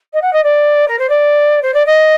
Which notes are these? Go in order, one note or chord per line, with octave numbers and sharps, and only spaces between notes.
D#5
F#5
D#5
D5
A#4
C5
D5
C5
D5
D#5